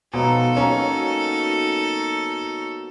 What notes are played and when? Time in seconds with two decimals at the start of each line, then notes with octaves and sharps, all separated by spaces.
0.13 B2 F3 F#3 G#3 D#4 A4
0.57 B2 F#3 A#3 C#4